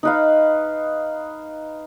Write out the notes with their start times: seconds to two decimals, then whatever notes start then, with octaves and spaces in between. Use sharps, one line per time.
0.03 D#4 B4 F5